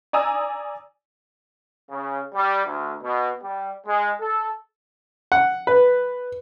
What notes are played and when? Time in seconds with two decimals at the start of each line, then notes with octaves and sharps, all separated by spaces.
0.13 D5 G#5 A#5 D#6 E6
1.90 C#3
2.35 G3
2.66 D2
3.03 B2
3.43 G3
3.87 G#3
4.21 A4
5.32 F#5
5.67 B4